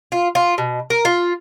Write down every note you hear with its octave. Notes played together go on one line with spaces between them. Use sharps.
F4
F4
B2
A#4
F4